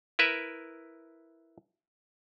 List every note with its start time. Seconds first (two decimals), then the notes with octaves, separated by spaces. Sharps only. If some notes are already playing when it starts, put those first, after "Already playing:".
0.19 E4 A#4 B4 E5